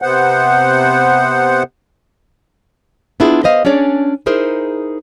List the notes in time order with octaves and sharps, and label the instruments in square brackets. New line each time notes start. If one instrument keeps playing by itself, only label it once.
[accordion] C3 B3 C5 F#5
[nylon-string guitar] B3 D4 E4 F4 G#4
B4 C5 D#5 F5
C#4 D4 G#4 C#5 D5
D#4 E4 G#4 A#4 C5